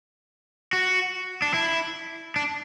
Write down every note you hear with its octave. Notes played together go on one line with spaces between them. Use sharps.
F#4
D4
E4
D4